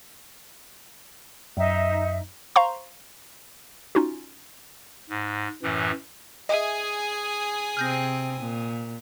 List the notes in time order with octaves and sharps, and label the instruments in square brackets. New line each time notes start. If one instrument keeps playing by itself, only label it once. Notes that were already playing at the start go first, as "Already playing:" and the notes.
[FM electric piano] F#2 [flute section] D#4 E5
[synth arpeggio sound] C5 F5 A#5 C6 C#6
C#4 D#4 F4 F#4
[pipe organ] G#2
F#2 A2 E3
[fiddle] G#4 [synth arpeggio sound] D#5 E5 [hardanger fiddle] G#5 D#6
[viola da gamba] C3 C4 [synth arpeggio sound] F6 G6 A#6
[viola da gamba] A#2